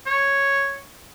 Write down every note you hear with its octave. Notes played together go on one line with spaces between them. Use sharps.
C#5